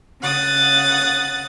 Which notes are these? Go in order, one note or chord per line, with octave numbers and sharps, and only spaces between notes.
C#3 F#5 D#6 A6